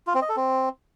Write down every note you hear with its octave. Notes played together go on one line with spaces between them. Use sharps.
F4
C4
D#5
A4
C4